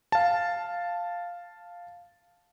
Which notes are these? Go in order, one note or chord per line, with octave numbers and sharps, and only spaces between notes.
F5 A5